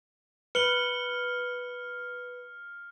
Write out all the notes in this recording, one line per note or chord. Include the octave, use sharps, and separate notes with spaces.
B4 F6 C#7 F#7 G7